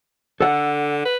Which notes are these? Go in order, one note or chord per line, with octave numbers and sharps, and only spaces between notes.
D3 A4 F#5
B4